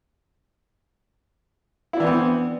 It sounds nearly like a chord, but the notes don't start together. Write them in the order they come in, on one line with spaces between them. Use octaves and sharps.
E4 D4 E3 C4 B3